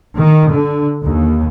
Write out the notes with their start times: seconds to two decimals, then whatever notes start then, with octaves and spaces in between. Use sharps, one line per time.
0.15 D#3
0.52 D3
1.03 D#2